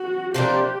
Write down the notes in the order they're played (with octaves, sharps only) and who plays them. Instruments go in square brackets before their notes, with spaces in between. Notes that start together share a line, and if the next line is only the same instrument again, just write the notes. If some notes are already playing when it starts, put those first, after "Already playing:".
Already playing: [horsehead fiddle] F#4
[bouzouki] C3 F3 A#3 D4 [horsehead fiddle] G4